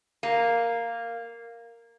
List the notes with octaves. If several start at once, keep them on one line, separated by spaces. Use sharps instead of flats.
A#3